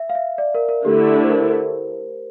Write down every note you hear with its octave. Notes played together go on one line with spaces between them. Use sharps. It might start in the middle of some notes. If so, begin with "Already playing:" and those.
Already playing: E5
F5
E5
D5
A#4
A#4
D3 A3 E4 G4
C5
A#4